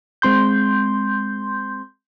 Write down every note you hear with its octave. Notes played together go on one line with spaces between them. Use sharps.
G#3 C4 C6 G6